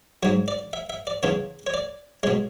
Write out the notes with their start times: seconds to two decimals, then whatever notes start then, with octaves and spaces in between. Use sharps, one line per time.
0.23 G#2 F#3 C#5
0.48 D5
0.73 E5
0.90 E5
1.07 D5
1.23 E2 C#3 E3 C#5
1.67 C#5
1.74 D5
2.23 B2 G#3 C#5